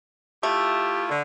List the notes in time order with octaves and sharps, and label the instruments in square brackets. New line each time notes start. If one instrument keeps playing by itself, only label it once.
[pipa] A3 [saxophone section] E4 F4 G4
[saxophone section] D3